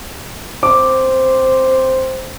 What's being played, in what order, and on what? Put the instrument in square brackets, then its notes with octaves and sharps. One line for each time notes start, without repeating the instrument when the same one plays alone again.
[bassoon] C4 [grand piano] D6